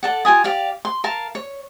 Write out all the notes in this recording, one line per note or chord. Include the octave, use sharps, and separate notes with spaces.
A4 D5 F#5
F4 G4 G#5 D#6
G4 D5 F5
C6
A#4 F5 A5
C#5